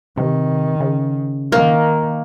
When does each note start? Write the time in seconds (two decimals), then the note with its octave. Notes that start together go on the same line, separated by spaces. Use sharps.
0.17 C3 D#3
0.80 C#3
1.52 D#3 A#3